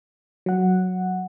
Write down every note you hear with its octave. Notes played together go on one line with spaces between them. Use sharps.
F#3 F#5